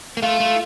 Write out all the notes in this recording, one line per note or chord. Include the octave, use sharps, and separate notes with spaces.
A#3
A3 F4
A3